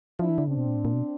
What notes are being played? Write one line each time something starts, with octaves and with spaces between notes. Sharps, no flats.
F3 D4 E4
E3
D3
C#3 C4 D4
B2
A#2
A2
A#2
B2